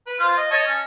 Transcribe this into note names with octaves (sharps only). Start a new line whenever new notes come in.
B4
F4 C5 F5
D#5
C#5 D#5 A5
C#4